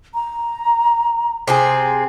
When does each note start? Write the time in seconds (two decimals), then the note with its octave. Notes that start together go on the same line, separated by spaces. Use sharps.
0.15 A#5
1.47 C3 C4 G#4